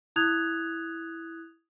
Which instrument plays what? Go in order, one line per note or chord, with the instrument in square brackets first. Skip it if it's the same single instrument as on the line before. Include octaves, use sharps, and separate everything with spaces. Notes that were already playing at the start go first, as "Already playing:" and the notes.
[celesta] E4 D#6 F#6 G#6 F7